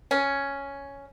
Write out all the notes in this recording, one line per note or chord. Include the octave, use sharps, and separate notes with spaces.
C#4